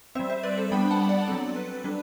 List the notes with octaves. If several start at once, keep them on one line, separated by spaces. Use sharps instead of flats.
G3 C4 C5 E5
C5 E5
B4 D5
A4 C5
G3 B3 D4 G5 B5
F#5 A5
D5 F#5
F#3 C4 A4
B4
G3 D4